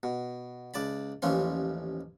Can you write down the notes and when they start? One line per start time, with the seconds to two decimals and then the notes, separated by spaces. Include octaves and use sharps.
0.03 B2
0.74 C#2 D5 A5 B5
1.22 A1 D#2 E3 F3 C#4 C6